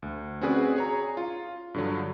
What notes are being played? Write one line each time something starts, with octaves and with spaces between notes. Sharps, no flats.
D2
C4 C#4 F#4 G#4 B4 D5
G#4 C#5 A#5
F4
G2 D3 F#3